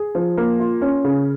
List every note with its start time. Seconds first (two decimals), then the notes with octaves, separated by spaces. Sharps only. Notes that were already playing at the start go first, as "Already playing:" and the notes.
Already playing: G#4
0.15 F3
0.37 A#3
0.59 F4
0.81 C#4
1.05 C#3